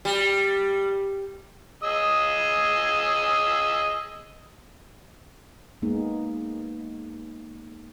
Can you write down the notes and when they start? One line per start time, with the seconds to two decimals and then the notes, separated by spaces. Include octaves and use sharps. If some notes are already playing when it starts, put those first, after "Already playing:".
0.05 G3
1.83 G#4 D#5 E6
5.82 G#3 A#3 B3 D#4